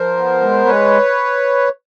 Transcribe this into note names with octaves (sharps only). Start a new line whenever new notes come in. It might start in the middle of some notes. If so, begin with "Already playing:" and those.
Already playing: F3 A#4 C5
B3
G#3
G#3 B4 C#5